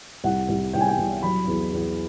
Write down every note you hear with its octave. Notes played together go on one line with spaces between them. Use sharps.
C2 F#5
C2
C2 G5
G#5
G5
C2
F#3 B5
E2
E2